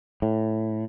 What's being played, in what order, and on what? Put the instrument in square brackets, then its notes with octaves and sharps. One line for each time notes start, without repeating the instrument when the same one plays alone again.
[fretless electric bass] A2